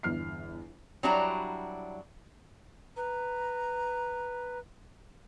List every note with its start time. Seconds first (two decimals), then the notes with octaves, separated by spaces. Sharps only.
0.03 G1 E2 F6 C7
1.03 F#3 G3 D4 E4 F#4 A#5
2.97 B4 A#5